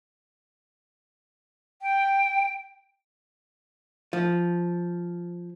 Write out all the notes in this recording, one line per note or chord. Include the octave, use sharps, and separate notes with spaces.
G5
F3